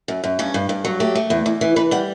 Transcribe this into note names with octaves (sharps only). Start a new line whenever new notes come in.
F#2
F#2
G2 C#4
G2
G2
F#3
A3 G4
A3
E2
E2
E3
E3 B4
G3 F#5